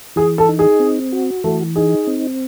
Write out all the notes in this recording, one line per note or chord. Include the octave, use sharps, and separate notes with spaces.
E3 G#4
A4
D#4
G#4
C4
F#4
E3 A3
D#4 G#4
C4